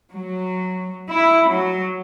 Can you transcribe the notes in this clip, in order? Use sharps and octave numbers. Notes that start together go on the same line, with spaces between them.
F#3
E4
F#3